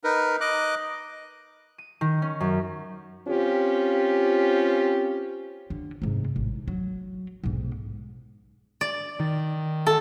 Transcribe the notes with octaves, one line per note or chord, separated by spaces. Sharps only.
D#4 A#4 B4
D#5 D6 F#6
D#7
D#3
C#4
F#2
C4 C#4 F4 G4
D3
G#2 C3
A1
F#3
B1 G#2
D5
D#3
A4